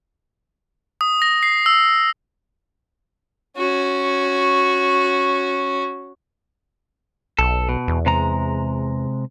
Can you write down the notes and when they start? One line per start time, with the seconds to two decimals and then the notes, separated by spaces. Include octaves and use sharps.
1.01 D#6
1.22 A#6
1.43 C7
1.66 E6
3.57 C#4 F#4
7.39 B1 A4
7.69 B2
7.88 E2
8.06 C3 G#3 A#5